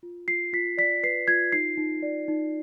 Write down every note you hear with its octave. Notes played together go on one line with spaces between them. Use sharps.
F4
F4 C7
F4 B6
D5 B6
B4 C7
F4 G#6
D#4 C7
D#4
D5
D#4